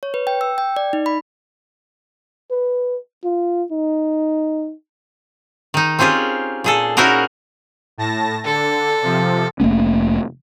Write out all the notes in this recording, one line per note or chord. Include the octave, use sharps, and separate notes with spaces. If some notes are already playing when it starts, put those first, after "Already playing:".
C#5
B4
G5
E6
G5
D5
D#4
B5
B4
F4
D#4
D#3 D#4
C4 C#4 F4 G4 G#4
A#2 G#4 A4
C#4 D#4 E4 F#4 G#4 A#4
A2 A5 A#6
D3 A4
C3 F3
F1 A3 A#3 C#4